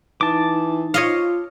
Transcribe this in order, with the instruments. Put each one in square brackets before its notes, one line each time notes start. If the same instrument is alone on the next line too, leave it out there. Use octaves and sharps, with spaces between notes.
[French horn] E3 [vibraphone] D#4 [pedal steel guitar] A5 D6
[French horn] F4 [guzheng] C#5 D#5 F5